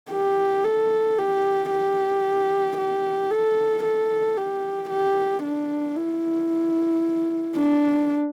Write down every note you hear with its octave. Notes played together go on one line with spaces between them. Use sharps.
G4
A4
G4
G4
G4
A4
A4
G4
G4
D4
E4
D4